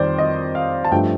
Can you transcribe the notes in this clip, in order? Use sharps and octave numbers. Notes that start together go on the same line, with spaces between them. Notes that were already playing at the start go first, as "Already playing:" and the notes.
Already playing: F2 D#3 G3 C5 D5
D#5
F5
A5
G2 F3 A3 G5